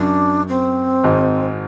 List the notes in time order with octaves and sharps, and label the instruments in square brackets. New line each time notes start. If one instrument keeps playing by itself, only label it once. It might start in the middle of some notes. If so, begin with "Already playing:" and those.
Already playing: [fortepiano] F#2 [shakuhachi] D4
[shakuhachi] C4
[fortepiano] G#1 G#2